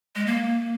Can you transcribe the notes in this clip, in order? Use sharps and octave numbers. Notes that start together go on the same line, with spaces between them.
G#3
A#3